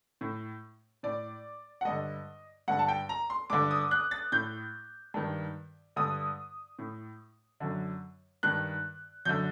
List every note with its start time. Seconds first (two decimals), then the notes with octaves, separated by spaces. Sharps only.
0.21 A2
1.03 A2 D5
1.81 F#5
1.85 G2 D3 D#5
2.68 G2 D3 F#5
2.79 A5
2.88 G5
3.09 A#5
3.30 C6
3.50 G2 D3 D6
3.71 D#6
3.91 F#6
4.11 A6
4.32 A2 G6
5.14 G2 D#3
5.96 G2 D3 D#6
6.79 A2
7.60 F#2 D3
8.43 G2 D#3 F#6
9.25 F#2 D3 G6